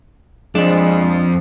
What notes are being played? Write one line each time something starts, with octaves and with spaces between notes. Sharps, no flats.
F2 F3 G#3 D4